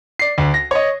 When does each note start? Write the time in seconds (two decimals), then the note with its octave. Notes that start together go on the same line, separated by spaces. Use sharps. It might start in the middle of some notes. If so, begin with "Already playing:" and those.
0.19 D5 C7
0.38 D2
0.54 A#6
0.71 C#5 D#5